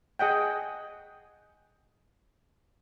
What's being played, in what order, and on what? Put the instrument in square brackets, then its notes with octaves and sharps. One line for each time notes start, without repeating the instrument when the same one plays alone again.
[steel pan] G#4 D#5 F#5 G5